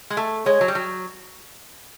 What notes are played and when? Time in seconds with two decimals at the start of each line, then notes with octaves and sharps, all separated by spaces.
0.10 G#3
0.17 A3
0.46 G#3 C#5
0.61 F#3
0.68 G3
0.75 F#3